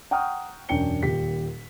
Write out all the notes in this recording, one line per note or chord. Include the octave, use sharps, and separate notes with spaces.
F#5 G5 A#5 C#6 D#6 F6
E1 F#2 D4 G5 C#7 G7
D#1 A#2 G4 B6